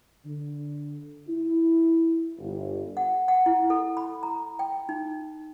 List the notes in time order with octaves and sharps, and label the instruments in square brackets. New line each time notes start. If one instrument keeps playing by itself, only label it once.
[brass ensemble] D3
E4
G1
[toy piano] F#5
F#5
E4
A4
B5
A#5
G5
D#4